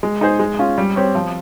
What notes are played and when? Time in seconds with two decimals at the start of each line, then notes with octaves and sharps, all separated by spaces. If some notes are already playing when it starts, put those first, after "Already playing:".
0.03 G#3
0.21 D#4 G#4 C5
0.39 G#3
0.59 C#4 F4
0.78 G3
0.96 C4 G4 C#5
1.15 F3